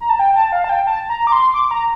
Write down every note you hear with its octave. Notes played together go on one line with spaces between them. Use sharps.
A#5
A5
G5
A5
F5
A5
G5
A5
A#5
D6
C6
D6
A#5